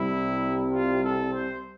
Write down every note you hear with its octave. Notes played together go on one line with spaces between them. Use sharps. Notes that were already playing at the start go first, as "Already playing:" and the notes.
Already playing: C2 C3 G3 E4
F4
A4
C5